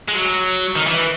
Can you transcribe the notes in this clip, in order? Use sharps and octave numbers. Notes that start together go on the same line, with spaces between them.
G#3
F#3
D#3
E3